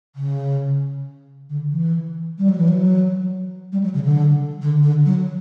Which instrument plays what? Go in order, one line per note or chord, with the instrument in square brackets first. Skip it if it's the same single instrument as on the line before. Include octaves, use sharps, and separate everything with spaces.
[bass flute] C#3
D3
E3
G3
F#3
E3
F#3
G3
F#3
C#3
D3
D3
D3
F#3